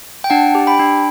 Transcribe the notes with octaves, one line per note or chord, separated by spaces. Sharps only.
G5
D4 F#5 A5
G4
G5 B5
D4